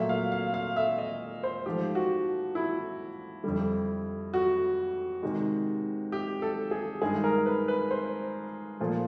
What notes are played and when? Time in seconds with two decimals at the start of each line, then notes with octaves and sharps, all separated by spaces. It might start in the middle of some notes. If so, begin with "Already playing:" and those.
Already playing: A#2 F#3 A3 E5
0.09 F5
0.32 F5
0.54 F5
0.76 E5
0.98 D#5
1.43 C5
1.66 G#2 F3 A3 G4
1.95 F#4
2.55 E4
3.44 F2 D3 G3
4.34 F#4
5.23 C3 D#3 G#3
6.12 G4
6.42 A4
6.71 G#4
7.01 G2 D#3 G#3 G#4
7.24 A#4
7.46 B4
7.68 B4
7.91 C5
8.80 A#2 F3 A3